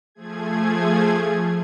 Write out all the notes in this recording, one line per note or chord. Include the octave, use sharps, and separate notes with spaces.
F3 A3 G#4 G#6